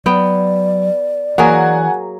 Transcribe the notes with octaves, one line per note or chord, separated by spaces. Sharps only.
F#3 B3 D5 G5
E3 F#3 A#3 G#4 F#5 G#5